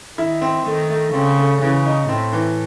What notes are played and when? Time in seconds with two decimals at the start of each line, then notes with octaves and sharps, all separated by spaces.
0.18 D#3 E4
0.41 C4
0.65 D#3 A3
0.90 A3
1.13 C#3 C4
1.37 A3
1.61 C#3 E3
1.86 D#4
2.09 A2 C4
2.33 E3